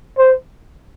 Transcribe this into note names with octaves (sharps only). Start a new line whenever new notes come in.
C5